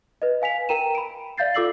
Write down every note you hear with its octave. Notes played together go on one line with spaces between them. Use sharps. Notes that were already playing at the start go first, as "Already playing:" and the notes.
B4 D#5
F5 G#5 B6 F7
A#4 G5 A#5 D#7 E7
B5 D7
D5 E5 F5 G6 A6 C7
F4 A4 D6 E6 C7 F#7